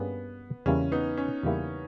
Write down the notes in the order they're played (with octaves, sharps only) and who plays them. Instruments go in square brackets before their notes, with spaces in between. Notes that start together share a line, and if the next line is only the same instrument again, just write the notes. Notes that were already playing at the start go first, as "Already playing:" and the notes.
Already playing: [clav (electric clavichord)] G2 G3 A#3 C#4 G#4 [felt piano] B3
[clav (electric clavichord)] E2 C#3 G3 A#3 E4 [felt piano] C#4
[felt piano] B3 D#4
C#4
[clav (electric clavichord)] E2 C#3 G3 A#3 E4